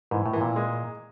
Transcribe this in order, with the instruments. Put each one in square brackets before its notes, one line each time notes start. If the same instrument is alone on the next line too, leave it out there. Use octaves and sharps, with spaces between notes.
[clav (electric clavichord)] G#2 [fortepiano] E3
[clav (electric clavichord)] A2
[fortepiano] E3
[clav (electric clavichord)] A#2
[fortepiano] G#3